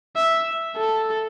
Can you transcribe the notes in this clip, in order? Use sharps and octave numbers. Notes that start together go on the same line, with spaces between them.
E5
A4